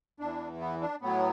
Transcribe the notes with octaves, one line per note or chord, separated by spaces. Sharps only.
E2 E3 D4
B3
D4
A2 F#3 B3